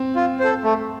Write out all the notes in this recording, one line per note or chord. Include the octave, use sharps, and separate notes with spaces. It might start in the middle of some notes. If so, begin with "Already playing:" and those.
Already playing: C4
F4
A4 C5
A3